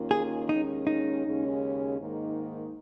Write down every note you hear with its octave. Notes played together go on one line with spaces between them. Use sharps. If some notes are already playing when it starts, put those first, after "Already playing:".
Already playing: D#2 D#3 A#3 C#4 F4
G#4
D#2 D#3 G#3 C#4 D#4
D#4
D#2 C#3 G#3 C#4
G#2 D#3 A#3 D#4